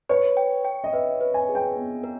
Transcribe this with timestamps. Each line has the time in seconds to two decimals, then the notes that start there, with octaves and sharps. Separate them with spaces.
0.09 B4 C#5
0.37 G5
0.65 G5
0.84 D#5
0.93 B4 E5
1.21 B4
1.34 G#5
1.49 G#4
1.55 G5
1.77 B3
2.04 A#4